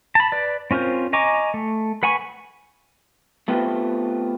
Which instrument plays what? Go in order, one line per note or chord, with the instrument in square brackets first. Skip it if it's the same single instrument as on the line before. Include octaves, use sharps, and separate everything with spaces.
[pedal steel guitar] A5 B5
B4 D5
C4 C#4 F4 A#4 C5
D#5 G#5 A#5 C#6 D6
A3
B4 F#5 G#5 B5 C#6
[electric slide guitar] A3 B3 C4 F4 G4